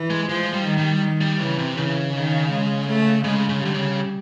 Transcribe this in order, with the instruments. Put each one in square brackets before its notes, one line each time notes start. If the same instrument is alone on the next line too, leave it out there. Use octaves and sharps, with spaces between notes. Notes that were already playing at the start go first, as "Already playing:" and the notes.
Already playing: [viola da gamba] E3
[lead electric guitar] G#3
[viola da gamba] F3 [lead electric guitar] G#3
[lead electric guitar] G3
[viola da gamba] D#3
[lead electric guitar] G3
[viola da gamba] D#3
[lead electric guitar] G3
[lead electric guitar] C#3 [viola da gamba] E3
[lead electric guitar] C3
[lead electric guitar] C#3 [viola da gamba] E3
[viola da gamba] D#3
G#3
A3
[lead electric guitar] C#3 [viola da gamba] G#3
[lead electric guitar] C#3
[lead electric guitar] D3 [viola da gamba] G3
[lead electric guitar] C#3